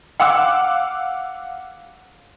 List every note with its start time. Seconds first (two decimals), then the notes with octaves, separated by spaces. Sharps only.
0.20 F5 F#5 D6 E6